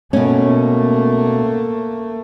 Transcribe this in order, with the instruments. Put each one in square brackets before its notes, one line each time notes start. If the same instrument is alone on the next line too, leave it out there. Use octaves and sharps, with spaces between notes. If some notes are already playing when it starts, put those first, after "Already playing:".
[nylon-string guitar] B2 C#4 [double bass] A3 A#3